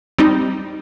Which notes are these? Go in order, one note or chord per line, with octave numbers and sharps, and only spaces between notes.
G3 C4 D#4